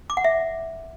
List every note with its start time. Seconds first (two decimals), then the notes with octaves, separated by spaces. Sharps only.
0.10 D6
0.17 F#5
0.24 E5